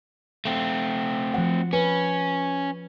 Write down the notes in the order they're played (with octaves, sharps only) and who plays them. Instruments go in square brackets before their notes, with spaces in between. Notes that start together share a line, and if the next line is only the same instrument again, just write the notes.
[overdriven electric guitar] A3 C4
[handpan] F3 F#5
[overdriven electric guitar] C#4 [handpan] B4